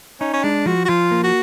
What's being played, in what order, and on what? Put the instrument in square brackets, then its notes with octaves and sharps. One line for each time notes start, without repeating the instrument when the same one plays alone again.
[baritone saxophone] C#4 [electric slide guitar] D#4
[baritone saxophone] C#4
[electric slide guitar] G#3 [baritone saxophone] D4
[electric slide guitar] F3 [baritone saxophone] F#4
[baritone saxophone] F#4
[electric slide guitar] F3 [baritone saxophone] F4
[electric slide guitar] A#3
[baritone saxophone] F#4